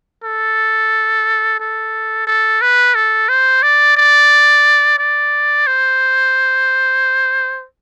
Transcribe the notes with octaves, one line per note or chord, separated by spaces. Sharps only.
A4
A4
A4
B4
A4
C5
D5
D5
D5
C5